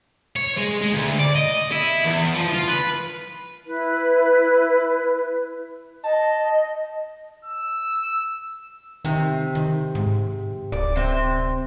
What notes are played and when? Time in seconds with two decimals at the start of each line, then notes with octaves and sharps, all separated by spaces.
0.36 C#5
0.58 G#3
0.81 G#3
0.93 D2
1.19 D5
1.35 D#5
1.72 E4
2.05 E2
2.35 F3
2.54 F4
2.68 B4
3.65 E4 B4
6.04 D#5 A5
7.45 E6
9.05 C3 D#3
9.55 D#3
9.95 G#2
10.72 D1 D5
10.96 C3 C4